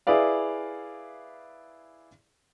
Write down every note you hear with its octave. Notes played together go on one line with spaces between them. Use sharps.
E4 G#4 B4 D5 F5